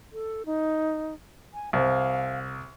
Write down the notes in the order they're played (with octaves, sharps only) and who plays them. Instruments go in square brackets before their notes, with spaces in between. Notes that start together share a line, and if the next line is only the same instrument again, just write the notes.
[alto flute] A4
D#4
G#5
[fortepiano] C2 [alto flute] F5